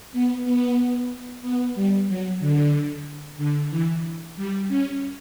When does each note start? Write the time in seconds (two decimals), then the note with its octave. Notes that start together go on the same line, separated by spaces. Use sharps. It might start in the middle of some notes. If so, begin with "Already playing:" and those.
0.12 B3
0.45 B3
1.42 B3
1.75 G3
2.08 F#3
2.40 D3
3.38 D3
3.70 E3
4.36 G3
4.68 C#4